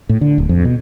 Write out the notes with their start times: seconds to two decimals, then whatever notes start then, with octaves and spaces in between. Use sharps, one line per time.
0.09 A2
0.21 D3
0.38 D1
0.49 F2
0.65 B2